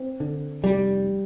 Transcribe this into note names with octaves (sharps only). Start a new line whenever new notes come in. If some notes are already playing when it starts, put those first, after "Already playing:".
Already playing: C4
D3
F1 G3